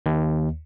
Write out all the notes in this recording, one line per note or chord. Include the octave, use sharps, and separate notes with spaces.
D#2